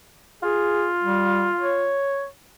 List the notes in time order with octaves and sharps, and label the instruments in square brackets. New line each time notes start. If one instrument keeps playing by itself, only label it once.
[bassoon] F4 [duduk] G#4
[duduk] G3
C#5